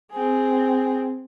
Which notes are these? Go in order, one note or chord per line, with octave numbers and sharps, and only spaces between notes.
C4 G#4